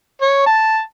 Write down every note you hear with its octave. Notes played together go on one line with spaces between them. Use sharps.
C#5
A5